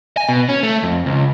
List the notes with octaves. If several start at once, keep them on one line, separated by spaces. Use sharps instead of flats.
G#5
B2
C#4
A3
F2
C#2